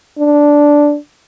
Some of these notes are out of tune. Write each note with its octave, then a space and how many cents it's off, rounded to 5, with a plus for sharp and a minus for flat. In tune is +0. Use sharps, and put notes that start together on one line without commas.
D4 -5